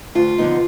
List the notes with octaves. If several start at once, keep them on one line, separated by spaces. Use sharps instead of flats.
D2 F4
D3 F3 B3 D#4